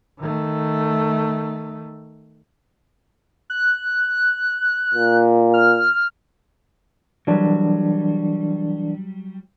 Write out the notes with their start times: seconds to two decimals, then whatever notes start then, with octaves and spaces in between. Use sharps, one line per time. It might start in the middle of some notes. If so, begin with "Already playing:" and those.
0.19 D#3 A3
3.50 F#6
4.94 A#2
5.54 F6
7.27 E3 F#3 G3 D4